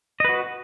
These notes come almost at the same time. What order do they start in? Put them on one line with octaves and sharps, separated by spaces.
D#5 B4 F#4